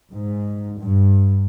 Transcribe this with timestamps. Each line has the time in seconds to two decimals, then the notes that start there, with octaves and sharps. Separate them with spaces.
0.11 G#2
0.78 G2